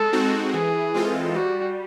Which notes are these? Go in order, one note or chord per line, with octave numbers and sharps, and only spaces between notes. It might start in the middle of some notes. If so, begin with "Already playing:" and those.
Already playing: G#3 A4
C4 D#4 F#4
E3 G#4
G#3 C4 F4 A4
G3 F#4